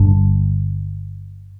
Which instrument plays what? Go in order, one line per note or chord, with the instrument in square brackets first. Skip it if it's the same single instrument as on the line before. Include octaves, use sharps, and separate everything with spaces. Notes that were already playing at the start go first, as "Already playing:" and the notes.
Already playing: [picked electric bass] G1 G2 D3